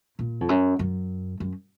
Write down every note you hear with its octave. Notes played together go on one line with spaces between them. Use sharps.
A#2
F2
F#2
F#2
F#2